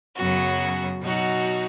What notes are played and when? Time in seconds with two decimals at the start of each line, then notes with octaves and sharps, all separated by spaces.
0.16 F#2 C#3 F#3 B3 F#4
1.01 B2 F#3 D#4 F#4